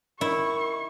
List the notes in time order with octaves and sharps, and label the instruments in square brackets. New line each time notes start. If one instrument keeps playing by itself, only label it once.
[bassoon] D#3 [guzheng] E4 [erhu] C#6